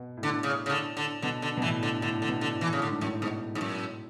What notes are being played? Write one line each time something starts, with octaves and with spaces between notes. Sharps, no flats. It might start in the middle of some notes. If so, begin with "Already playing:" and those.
Already playing: B2
A2
D3
C#3
C#3
D3
D3
B2 D3
D3
B2
A2 E3
D3
A2 D3
D3
B2
D3
A2
E3
C#3
A2 D3
G#2
F#2 A2
G#2 B2
G#2
F#2